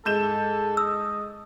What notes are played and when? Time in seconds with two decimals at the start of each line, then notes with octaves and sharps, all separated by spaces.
0.05 G#2 A4 G6 E7
0.77 D#5 E6